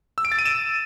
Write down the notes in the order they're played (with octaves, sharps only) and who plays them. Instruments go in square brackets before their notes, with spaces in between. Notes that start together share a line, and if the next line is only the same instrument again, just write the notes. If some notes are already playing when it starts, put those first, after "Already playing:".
[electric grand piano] E6
D7
A6
D#7
E7